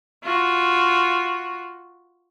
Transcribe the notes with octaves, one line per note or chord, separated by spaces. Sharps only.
F4 F#4